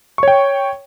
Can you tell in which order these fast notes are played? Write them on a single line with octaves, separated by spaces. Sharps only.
C#6 C#5 G5